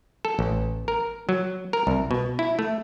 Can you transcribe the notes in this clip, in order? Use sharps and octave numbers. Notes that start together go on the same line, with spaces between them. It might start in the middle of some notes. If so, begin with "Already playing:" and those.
A4
A1
A#4
F#3
A#4
C2
B2
E4
A3